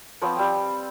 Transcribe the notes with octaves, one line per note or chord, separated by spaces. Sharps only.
F3 B3 C4 C#5
G3 C4